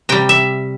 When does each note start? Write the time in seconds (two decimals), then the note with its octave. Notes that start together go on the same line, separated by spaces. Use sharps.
0.09 C3 G3 G5
0.29 E5